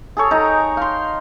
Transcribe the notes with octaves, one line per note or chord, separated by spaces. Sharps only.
G#4 A4 C#5
D#4 G5 A#5
F5 C6